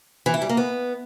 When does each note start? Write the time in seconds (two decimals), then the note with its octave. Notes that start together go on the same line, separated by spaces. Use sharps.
0.26 E3
0.34 E4
0.42 G3
0.49 A#3
0.57 B3